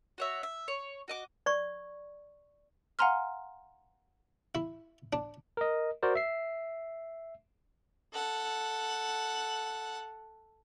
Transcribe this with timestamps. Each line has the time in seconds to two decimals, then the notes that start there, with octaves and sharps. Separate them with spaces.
0.18 F#4 C#5 E5
0.43 E5
0.68 C#5
1.08 F#4 D#5 D6
1.46 D5 C#6
2.99 F5 F#5 G#5 A#5 C6 F6
4.55 E4
5.13 D4
5.57 A#4 D#5
6.03 F#4 A#4 C5 D5
6.15 E5 C7
8.13 A4 F#5